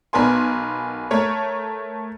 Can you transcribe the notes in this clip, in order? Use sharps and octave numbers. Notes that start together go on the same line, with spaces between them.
B1 B3 A#4 G#5 C6
A3 A#4 C#5